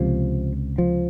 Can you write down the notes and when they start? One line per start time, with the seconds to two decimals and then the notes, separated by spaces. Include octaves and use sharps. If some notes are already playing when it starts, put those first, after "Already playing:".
Already playing: C#2 C3 F3
0.78 F3